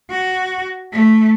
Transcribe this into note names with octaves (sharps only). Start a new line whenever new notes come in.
F#4
A3